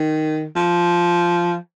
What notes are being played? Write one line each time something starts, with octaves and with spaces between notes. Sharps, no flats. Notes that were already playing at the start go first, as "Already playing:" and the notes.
Already playing: D#3
F3